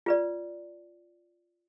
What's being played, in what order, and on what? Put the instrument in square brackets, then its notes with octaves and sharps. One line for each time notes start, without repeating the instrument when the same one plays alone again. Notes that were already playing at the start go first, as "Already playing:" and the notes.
[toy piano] F4 B4 D5